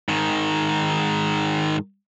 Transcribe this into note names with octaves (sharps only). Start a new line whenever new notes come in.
G#2 D#3